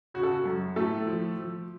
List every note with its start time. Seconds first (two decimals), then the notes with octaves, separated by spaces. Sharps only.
0.14 C#3 F#4
0.23 A4
0.32 F#4
0.46 F#2
0.76 A2 A3 A4
1.06 F3
1.37 F3